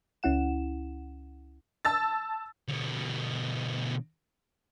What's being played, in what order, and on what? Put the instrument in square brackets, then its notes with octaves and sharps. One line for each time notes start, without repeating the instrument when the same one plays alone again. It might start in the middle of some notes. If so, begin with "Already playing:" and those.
[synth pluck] C#2 C#4 E4 F#5 E7
[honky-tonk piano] A5 E6 A6
[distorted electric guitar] B2 D3